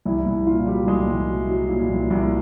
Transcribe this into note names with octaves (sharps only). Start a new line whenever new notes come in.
C2 E4
C2
A#2 F4
F#3 G3 G4
C2 G#3 G#4
C2
F#3
F#3
A#2
C2
C2